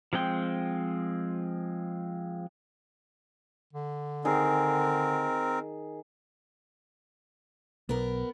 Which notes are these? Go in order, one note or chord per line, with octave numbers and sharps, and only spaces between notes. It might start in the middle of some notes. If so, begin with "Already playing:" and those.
F3 G#3 C4 G5
D3
D#3 C4 G#4 A#4
B1 B3 A#4